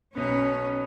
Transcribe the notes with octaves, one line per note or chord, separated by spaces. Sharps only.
B1 B2 B3 C#4